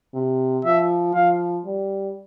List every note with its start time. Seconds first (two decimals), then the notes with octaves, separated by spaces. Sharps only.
0.14 C3
0.65 F3 E5
1.14 F3 F5
1.65 G3